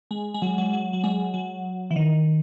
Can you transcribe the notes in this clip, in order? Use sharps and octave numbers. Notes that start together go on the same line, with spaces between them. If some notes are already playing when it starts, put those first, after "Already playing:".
G#3
G#3
F#3
F#3
F#3
F#3
G#3
F#3
E3
D#3